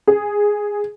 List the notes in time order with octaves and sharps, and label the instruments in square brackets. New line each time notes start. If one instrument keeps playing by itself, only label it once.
[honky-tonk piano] G#4